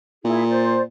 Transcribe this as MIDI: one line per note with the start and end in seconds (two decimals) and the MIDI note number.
0.25 0.83 46
0.25 0.43 64
0.25 0.43 68
0.48 0.81 72
0.48 0.81 74